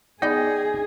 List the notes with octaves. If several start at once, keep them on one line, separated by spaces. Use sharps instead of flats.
B3 D#4 G#4 D5 G5